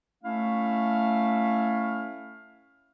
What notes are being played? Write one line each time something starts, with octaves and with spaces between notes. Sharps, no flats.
A3 C#4 E4 F5